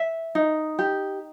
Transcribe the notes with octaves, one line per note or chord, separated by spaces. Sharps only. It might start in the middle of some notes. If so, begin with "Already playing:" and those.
Already playing: E5
D#4
G4